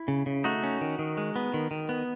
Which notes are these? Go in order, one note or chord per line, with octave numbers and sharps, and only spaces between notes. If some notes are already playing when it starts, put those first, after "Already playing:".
Already playing: E4
C#3
C#3
A3 D#4 F#4
C#4
D#3
D#3
G#3
B3
D#3
D#3
B3